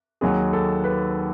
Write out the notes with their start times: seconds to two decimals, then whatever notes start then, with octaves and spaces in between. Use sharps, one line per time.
0.21 D#2 D#3 F#3 G#4
0.53 A4
0.84 B4